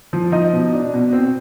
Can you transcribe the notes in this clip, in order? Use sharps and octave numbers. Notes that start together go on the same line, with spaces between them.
F3
F3 D#4 D#5
B2
D4
B2
C4